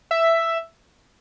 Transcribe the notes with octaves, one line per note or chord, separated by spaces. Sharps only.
E5